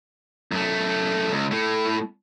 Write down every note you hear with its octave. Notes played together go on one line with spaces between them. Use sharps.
F#2 A3
C#2
A2 A3